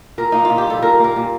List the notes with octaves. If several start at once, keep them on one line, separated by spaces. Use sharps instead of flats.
A#2 A#4
A#3 D#4
F4
A#2
G4
G3 A4
A#2 A#4
A#3 A#4
A#2